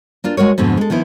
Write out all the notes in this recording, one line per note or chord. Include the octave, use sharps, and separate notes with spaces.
A#3 D4 F4
G#3 F#4 A#4 C#5
F2 G#2 B2 D3
G#3 A4
D#3 F3 B3 E4